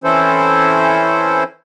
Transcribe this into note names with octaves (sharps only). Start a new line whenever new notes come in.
E3 C4 C#4 E4 A4 C5